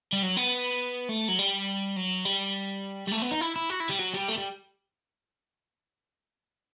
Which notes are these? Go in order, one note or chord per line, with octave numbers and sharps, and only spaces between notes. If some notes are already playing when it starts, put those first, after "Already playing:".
G3
F#3
B3
A3
F#3
G3
F#3
G3
G3
A3
B3
D#4
E4
E4
F#4
E4
G3
F#3
G3
A3
G3